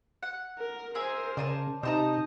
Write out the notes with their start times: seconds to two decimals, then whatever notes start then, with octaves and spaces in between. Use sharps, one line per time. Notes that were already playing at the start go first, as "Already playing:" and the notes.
0.23 F#5
0.59 A#4
0.95 G#4 A#4 C5 E5 G#5
1.37 C#3 D5 G#5 A5
1.83 C3 D#4 C5 D#5 A5 A#5